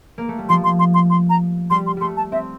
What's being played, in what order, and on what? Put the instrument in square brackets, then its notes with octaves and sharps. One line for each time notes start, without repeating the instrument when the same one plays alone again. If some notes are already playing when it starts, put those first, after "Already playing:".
[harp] A#3
A3
G3
[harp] F3 [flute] C6
[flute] C6
C6
C6
C6
A#5
[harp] G3 [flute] C6
[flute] C6
[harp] G3 A3 [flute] C6
[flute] A5
[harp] C4 [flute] E5